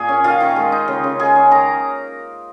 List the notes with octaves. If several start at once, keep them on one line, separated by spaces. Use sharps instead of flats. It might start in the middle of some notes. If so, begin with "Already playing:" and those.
Already playing: A#2 A#3 G#4 G#5
C#4
D#3 F4 F5
D#3
G#3
D#4
C#3
C#3
G#3 G#4 G#5
C#4
D#3 A#4 A#5